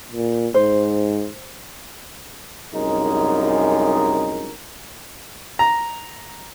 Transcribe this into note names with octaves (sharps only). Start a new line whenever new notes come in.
A#2
G#2 C5
C2 F#2 G#3 D#4 A#4
A#5